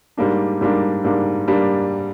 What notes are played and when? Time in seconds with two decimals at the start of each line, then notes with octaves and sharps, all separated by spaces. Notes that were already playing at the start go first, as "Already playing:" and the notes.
0.17 G#2 G3 A#3 D4
0.61 G#2 G3 A#3 D4
1.04 G#2 G3 A#3 D4
1.48 G3 A#3 D4